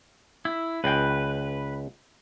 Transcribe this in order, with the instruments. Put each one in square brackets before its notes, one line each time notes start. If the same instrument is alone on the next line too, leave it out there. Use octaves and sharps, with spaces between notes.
[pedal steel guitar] E4
[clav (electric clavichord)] C#2 G5 [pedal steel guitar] B4